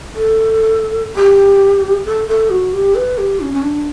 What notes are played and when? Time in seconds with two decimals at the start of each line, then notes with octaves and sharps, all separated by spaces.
0.14 A4
1.16 G4
2.05 A4
2.28 A4
2.50 F#4
2.73 G4
2.95 B4
3.18 G4
3.40 C#4
3.54 C#4
3.62 D4